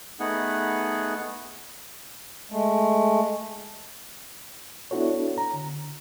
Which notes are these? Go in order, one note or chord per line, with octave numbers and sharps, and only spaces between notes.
A3 B3 D#4 G#4 F#5
G#3 A3
B3 D4 E4 F#4 A4 C#5
A#5
D3